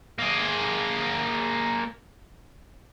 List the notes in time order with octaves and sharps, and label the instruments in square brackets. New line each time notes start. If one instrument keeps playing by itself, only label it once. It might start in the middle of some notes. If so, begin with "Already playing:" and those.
[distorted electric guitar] A#3 G#4